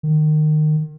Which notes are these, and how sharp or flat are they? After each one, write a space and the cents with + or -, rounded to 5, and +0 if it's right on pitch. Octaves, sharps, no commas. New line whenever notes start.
D#3 -25